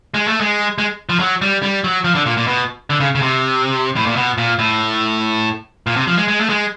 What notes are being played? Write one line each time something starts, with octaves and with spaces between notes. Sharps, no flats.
G#3
A3
G#3
G#3
F3
F#3
G3
G3
F#3
F3
D3
A#2
A#2
B2
D3
C#3
C#3
C3
A2
A#2
B2
A#2
A2
A#2
C3
F3
G#3
G#3
A3
G#3